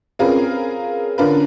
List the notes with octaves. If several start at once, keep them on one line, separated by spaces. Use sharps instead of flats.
C4 C#4 F4 G#4 A#4 B4
D3 C#4 D4 F4 A#4 B4